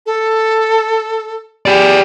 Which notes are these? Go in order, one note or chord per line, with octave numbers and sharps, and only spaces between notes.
A4
G4 G#4 D5